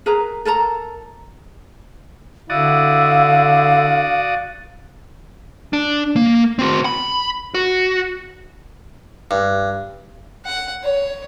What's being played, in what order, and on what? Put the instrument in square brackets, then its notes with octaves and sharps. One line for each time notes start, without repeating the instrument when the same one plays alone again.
[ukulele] G#4 A#4 B4 A#5
A4 A#4 A5 A#5
[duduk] D3 [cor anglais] E4 [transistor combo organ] F#4 D5 D#6 [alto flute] F5
[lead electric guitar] D4
A#3
C4 F#4
B5
F#4
[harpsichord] G2
[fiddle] F#5
C#5